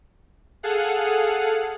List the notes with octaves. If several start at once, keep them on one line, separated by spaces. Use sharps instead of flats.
G#4 A4 F5 F#5